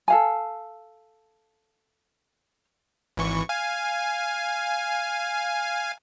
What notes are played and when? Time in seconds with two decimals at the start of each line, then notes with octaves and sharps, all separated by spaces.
0.08 A4 F5 G#5
3.17 G#1 E3 C#6
3.49 F5 G#5